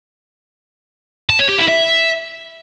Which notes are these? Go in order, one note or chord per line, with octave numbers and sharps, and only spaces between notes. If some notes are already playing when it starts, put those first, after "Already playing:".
A5
C#5
G4
E4
E5